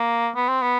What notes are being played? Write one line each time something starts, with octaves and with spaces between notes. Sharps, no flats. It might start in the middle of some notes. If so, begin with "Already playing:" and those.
Already playing: A#3
B3
C4
B3